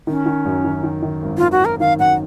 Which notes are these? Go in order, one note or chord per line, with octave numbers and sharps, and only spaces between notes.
D#3 C#4
D#3
F#2
D#3
D#3
D#3
G#1
D#3 F4
F#4
D#3 A#4
D#3 F5
F#2 F#5